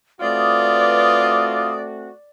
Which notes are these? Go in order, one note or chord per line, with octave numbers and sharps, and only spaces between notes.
A3 C4 F4 F#4 B4 D5 D6 D#6